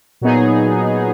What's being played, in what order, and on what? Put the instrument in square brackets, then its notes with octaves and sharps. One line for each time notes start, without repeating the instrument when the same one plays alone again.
[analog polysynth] A#2 F#3 B3 D#4 G#4